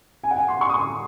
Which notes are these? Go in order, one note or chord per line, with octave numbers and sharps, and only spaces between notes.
G#5
F#5
G#5
C6
C#6
D#6
C#6